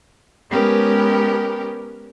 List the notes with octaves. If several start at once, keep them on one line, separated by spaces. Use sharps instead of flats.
G#3 B3 C#4 G4 A#4